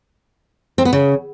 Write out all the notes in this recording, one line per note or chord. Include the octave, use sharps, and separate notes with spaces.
C4
B3
C#3